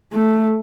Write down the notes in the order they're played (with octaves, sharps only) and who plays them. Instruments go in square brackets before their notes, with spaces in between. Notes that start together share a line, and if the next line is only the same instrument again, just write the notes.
[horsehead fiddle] A3